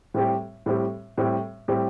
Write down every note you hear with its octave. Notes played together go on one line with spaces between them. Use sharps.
A2 G3 C4 G4
A2 G3 C4 G4
A2 G3 C4 G4
A2 G3 C4 G4